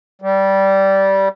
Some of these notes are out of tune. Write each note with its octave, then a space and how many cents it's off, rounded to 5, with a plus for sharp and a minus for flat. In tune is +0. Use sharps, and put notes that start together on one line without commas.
G3 -15